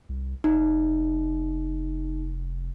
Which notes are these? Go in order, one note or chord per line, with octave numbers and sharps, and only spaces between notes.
C2
F1 D#4